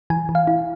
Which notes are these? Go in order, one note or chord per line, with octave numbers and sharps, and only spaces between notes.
E3 G#5
E3
F5
E4